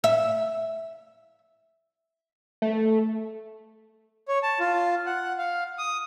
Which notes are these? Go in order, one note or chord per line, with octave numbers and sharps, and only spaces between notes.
E5
A3
C#5
A5
F4
F#5
F5
D#6